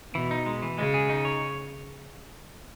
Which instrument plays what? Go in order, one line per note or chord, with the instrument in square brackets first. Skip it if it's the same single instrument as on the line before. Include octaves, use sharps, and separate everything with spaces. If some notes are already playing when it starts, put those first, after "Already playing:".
[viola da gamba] B2 [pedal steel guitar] E3
[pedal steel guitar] D#4
G#3
E3
[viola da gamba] C#3 [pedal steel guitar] G#3
[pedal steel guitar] G#4
D#4
C#5